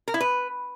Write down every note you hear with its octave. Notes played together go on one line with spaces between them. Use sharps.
A#4
E4
B4